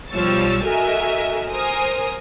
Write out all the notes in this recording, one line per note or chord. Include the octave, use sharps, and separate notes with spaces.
B1 F3 G3 C#5 E6 A6
F#4 A4 A#4 D#5 E5 G#5
A#4 C5 G#5 D#6